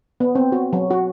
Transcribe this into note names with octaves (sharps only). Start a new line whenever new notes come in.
B3
C4
F#4
F#3
F#4